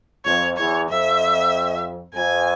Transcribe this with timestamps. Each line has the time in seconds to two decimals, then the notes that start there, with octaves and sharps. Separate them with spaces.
0.25 F2 C#5
0.57 E2 C#5
0.89 F2 E5
2.14 F2 G#5